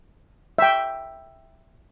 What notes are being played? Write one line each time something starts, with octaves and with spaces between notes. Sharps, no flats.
E5 G5